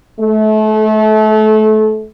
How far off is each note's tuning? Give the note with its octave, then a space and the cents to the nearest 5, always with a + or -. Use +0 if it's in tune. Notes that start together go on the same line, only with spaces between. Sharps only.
A3 -30